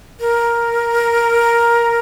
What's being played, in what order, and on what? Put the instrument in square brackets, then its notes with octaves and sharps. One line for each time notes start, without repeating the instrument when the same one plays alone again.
[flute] A#4